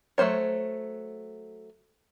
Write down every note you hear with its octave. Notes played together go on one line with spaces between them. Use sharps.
F#3 A3 B3 C5 C#5